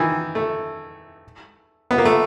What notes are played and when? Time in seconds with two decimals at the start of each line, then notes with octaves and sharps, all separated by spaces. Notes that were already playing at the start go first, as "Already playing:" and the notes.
Already playing: D#3 E3
0.35 A3
1.91 B3
1.98 A#3
2.05 A3